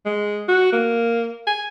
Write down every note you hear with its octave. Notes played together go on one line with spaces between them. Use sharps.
G#3
F#4
A#3
G#5